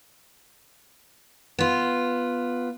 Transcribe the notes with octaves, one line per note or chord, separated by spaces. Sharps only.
B3 F4